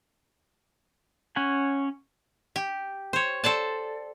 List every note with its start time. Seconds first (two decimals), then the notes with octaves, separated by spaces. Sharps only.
1.36 C#4 C#5 F#5 G#5
2.56 G4
3.13 C5 C#5
3.44 A4 C5 D5 A5